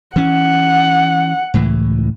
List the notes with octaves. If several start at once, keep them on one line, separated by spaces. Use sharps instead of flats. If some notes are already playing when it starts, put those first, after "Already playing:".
E3 C#4 F#5
C#2 A2 E3